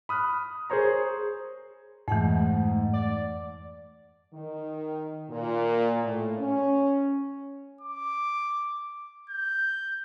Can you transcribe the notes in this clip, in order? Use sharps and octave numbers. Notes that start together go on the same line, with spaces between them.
B5 D#6 F6 F#6
G#4 A#4 C5 C#5 A#5
F2 G#2 E3 A3 F#5
D5
D#3
A#2
A2
C#4
D6
G6